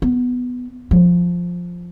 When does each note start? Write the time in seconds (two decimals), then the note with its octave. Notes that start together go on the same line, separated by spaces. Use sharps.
0.02 B3
0.91 F3